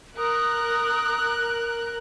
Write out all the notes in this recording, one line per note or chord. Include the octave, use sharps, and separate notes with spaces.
A#4 D#6 F#6